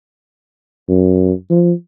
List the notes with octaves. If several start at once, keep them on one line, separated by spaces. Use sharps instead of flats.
F#2
F3